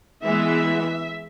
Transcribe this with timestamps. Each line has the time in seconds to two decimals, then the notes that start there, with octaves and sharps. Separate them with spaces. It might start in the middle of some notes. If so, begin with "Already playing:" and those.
0.23 E3 G#3 B3 E5